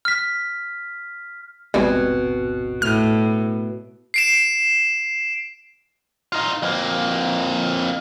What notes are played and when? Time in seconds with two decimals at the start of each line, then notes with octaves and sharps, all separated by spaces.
0.05 F6 B6
1.74 D#1 G#1 B2 G3 G#3 C4 F#4 G#5
2.82 A2 F6
4.14 C7 D7 E7
6.32 D#4 F4
6.62 F2 A#3